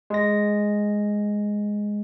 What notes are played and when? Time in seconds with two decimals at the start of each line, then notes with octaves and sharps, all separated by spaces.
0.10 G#3 A#6